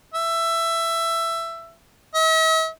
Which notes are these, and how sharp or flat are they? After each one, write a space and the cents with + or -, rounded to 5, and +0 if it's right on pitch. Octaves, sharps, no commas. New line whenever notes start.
E5 +15
E5 -45